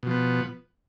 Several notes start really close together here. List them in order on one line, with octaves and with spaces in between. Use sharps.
B2 F3 B3